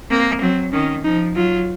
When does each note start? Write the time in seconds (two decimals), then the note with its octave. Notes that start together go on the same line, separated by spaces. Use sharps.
0.10 A#3 C4
0.41 F#3 C4
0.73 D#3 C#4
1.04 F3 D#4
1.36 F#3 F4